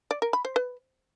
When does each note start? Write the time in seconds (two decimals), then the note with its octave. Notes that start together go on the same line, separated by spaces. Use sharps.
0.11 D5
0.22 A#4
0.33 B5
0.45 C5
0.56 B4